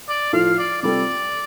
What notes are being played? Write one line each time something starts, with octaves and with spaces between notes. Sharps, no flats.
D5
A2 F3 A3 F4 F5
D5
C3 G3 F4 A4 D5